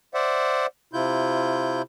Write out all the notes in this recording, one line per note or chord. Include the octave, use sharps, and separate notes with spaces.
C5 D5 E5 F#5
C3 E4 F4 G6